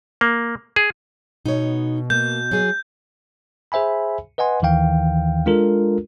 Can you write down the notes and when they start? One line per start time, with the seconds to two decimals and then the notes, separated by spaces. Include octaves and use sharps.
0.21 A#3
0.76 G#4
1.46 B2 D#4 C#5
2.10 A#3 G6
2.51 F#3 G#4
3.72 G#4 C5 E5 G#5 B5
4.38 B4 D#5 F#5 G#5 C6
4.62 D#2 D#3 E3 F5 G5
5.46 G#3 D4 F4 A4 A#4